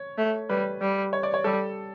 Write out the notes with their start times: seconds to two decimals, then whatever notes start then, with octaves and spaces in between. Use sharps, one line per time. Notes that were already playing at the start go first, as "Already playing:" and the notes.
Already playing: C#5
0.18 A3
0.49 G3 B4
0.81 G3
1.13 C#5
1.23 D5
1.34 C#5
1.44 G3 A4